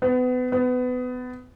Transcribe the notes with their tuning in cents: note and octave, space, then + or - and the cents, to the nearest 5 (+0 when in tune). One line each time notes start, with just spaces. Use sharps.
B3 +30
B3 +25